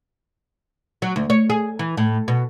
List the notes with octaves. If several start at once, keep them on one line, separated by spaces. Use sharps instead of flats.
F#3
D2
C#5
G#4
E3
A2
B2